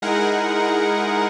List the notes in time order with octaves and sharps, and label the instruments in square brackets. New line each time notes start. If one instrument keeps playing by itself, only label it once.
[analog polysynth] G#3 D#4 E4 G#4 A#4 F#5